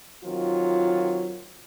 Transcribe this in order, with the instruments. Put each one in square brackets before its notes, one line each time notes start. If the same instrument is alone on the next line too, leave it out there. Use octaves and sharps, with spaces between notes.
[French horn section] D#3 F#3 C4 F4